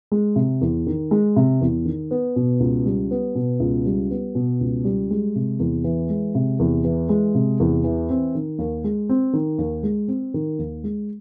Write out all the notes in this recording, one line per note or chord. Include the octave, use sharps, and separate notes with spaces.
G#3
C3
E2
D#3
G#3
C3
E2
D#3
B3
B2
C#2
G3
B3
B2
C#2
G3
B3
B2
C#2
G3
G#3
C3
E2
E3
G#3
C3
E2
E3
G#3
C3
E2
E3
C4
D#3
D#2
G#3
C4
D#3
D#2
G#3
C4
D#3
D#2
G#3